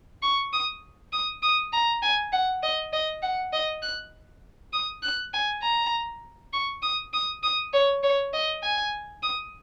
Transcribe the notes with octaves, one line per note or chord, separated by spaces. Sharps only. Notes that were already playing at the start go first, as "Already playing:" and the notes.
C#6
D#6
D#6
D#6
A#5
G#5
F#5
D#5
D#5
F#5
D#5
F#6
D#6
F#6
G#5
A#5
C#6
D#6
D#6
D#6
C#5
C#5
D#5
G#5
D#6